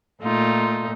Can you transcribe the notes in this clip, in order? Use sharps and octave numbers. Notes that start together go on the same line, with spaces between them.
A#2 A3 D#4 F4